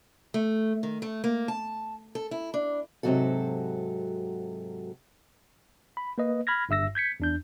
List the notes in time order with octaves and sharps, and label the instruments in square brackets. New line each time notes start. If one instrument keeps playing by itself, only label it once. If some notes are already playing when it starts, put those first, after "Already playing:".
[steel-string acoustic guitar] A3
D#3
A3
A#3
A5
A4
E4
D4
G#2 C3 E3 F#3 F#4 A4
[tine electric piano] B5
A#3 B4 D#5
B5 F6 G#6 A#6
G1 G2 E5 E6 A#6
G6 G#6 B6 C#7
E2 D4 G6